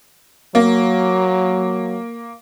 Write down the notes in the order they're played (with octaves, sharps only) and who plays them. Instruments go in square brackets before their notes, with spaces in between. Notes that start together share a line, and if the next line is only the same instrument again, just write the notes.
[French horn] F#3 [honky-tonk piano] A#3